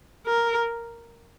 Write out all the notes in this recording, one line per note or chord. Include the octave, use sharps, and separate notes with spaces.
A#4